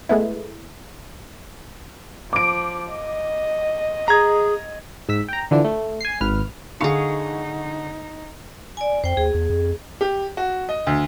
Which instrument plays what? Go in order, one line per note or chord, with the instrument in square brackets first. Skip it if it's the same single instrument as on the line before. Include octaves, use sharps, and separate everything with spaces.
[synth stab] G#3 A3 B3 E4
[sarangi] F3 [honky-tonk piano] D6 D7
[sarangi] D#5
[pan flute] G#4 [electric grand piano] A#5 G#6
[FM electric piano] G#2 E6 B6
G5 A#5
D3 E3 F3 D4
A3
G#5 C7
G#1 B4 F6
[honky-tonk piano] D3 C#6 C#7 [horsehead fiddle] D#4 [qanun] G#4 F5
[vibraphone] D5 G#5
[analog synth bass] F2 [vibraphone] C5 G5
[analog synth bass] D#2 [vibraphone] G#4
[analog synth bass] E2
F2
[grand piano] G4
F#4
D#5
D2